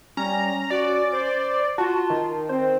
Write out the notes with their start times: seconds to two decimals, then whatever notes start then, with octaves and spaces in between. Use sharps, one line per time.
0.17 G3 C#4 A#5
0.70 F#4 D5
1.12 C5
1.78 F4 F#4 A5
2.10 D#3
2.49 C4 C5